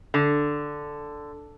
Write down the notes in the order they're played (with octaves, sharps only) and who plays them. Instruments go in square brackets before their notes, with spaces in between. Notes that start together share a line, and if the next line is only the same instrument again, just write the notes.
[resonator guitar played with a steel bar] D3